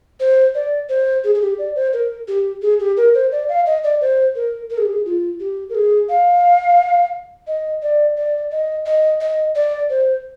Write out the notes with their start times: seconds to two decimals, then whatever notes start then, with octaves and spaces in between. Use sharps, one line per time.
0.20 C5
0.55 D5
0.89 C5
1.24 G#4
1.35 G#4
1.41 G4
1.58 D5
1.75 C5
1.93 A#4
2.28 G4
2.62 G#4
2.80 G4
2.97 A#4
3.15 C5
3.32 D5
3.49 F5
3.66 D#5
3.84 D5
4.01 C5
4.36 A#4
4.70 A#4
4.78 G#4
4.85 G4
4.92 G#4
5.05 F4
5.40 G4
5.69 A#4
5.75 G#4
6.09 F5
7.47 D#5
7.82 D5
8.17 D5
8.52 D#5
8.86 D#5
9.21 D#5
9.56 D5
9.90 C5